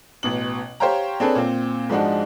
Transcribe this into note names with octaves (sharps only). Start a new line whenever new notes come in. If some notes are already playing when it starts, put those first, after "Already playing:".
A1 B2 F#7
G4 C5 C#5 F5 G5 A#5
C4 D4 G#4 A4 B4 C#5
A#2 C4
G#2 F3 G#3 D4 D#4 F#4